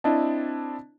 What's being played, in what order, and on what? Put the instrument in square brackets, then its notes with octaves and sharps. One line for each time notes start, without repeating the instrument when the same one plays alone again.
[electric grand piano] C4 D4 E4 D#5 A5